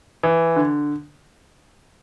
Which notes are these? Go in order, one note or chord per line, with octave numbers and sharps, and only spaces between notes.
E3
D3